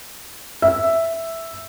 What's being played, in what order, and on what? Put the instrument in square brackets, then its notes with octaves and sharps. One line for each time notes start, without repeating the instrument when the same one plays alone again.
[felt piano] E5